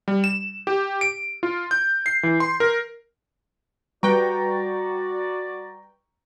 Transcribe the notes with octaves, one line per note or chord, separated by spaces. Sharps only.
G3
E7
G4
D7
F4
G6
C7
E3
C6
A#4
G3 F#4 B4 D5 G5 A#5 C#6